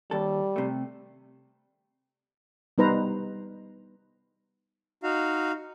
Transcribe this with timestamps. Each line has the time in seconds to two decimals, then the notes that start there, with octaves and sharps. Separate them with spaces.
0.11 D#2 G3 A4
0.56 C3 A3
2.78 G3 B3 D#4 B4 C5 A#5
5.03 D#4 F#4 F5